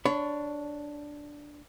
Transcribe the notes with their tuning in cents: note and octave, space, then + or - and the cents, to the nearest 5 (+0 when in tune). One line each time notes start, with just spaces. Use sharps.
D4 +0 C#5 +15 B5 +40